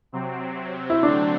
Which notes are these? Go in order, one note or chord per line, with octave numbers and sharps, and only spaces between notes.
C3 F#3 C4
E4
D3 F#3 A3 C4 D4